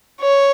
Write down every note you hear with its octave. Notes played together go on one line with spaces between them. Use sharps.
C#5